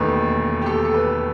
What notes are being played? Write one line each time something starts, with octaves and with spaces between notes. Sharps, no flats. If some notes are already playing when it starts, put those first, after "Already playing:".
Already playing: E1 D#2 D#3 A3 B4
G4
A4
A4
B4